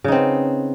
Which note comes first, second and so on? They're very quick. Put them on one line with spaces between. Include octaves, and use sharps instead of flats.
C#3 D#4 C4 B3